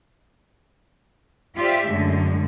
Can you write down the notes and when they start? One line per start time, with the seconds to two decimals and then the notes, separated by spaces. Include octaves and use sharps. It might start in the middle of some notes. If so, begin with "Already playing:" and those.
1.57 F4 G4 C5 D5 E5
1.89 F#2 A2 D3 G#3